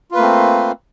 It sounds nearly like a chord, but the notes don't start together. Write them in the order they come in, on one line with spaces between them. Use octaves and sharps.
F4 B4 A#3 A3 C4